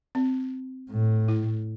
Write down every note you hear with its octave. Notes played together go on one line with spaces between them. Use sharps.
C4
A2
E4